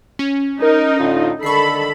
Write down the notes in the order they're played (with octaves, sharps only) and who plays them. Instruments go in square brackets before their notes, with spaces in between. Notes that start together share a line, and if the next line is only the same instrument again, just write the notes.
[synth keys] C#4
[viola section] D#4 [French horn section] A#4
[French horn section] A2 D3 F4
[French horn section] D3 D#3 [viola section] A4 B5 [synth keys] C#6 C7